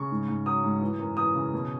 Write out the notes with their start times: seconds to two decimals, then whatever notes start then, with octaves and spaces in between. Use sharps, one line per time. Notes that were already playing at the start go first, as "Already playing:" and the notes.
Already playing: C#3 C#6
0.11 G#2
0.28 G#2
0.46 F#3 D#6
0.64 G#2
0.81 E3
0.99 F#2
1.17 E3 D#6
1.35 C#3
1.53 B2